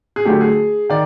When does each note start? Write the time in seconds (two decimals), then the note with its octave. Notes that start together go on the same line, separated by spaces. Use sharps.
0.16 G#4
0.25 D3 F#3 A3 G4
0.41 G#4
0.90 D#3 D5